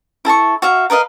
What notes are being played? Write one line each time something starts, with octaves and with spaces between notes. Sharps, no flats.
E4 A4 A5 C#6
F#4 E5 F5
A#4 B4 D#5 F5